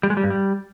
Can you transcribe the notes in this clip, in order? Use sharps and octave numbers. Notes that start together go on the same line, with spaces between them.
G3
G#3
G3
G2
G3